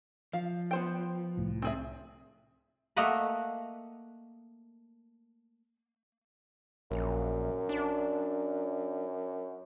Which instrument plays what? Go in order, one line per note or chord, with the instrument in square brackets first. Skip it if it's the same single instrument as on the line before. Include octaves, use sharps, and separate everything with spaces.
[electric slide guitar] F3 [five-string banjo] F5
[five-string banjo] B3 C5 G5
[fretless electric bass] C2 A2
[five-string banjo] C4 G#4 E5
[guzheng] A3 A#3 D#5 F#5 B5
[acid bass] A#1 [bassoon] F#2
[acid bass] D4